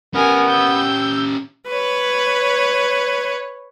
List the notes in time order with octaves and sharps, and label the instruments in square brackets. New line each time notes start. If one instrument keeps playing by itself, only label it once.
[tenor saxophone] B3 [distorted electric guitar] C#4 G4 [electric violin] A#4 G#5
[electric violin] E6 G6
[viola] B4 C#5